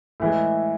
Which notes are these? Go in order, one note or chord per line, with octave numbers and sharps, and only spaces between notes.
A2 E3 G#3